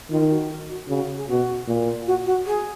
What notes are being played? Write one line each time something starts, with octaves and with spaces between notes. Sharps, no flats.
D#3 F4
F#4
A#4
F#4
C#3 F#4
G#4
B2 F#4
A#2
F#4
F#4
G#4